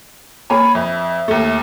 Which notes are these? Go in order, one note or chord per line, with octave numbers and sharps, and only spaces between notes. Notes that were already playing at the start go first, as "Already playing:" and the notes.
A#3 C#5 G#5 B5
F2 E5
D#2 A3